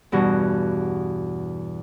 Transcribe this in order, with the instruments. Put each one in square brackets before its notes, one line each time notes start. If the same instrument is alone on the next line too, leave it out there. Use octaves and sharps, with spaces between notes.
[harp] E2 G2 B2 F#4